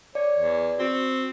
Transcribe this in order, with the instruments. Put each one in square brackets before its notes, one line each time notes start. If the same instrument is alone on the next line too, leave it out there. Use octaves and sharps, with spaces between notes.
[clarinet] C#5 [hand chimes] D5
[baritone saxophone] E2
[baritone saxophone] C4 [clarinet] F#4